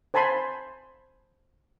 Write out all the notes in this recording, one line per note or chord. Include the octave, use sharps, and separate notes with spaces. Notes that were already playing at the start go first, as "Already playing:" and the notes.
C5 G#5 A5 B5 C6